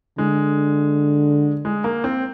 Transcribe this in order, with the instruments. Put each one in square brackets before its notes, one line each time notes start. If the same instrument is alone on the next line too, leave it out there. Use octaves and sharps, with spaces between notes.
[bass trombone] D3 [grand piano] G#3
[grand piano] G#3
A#3
C4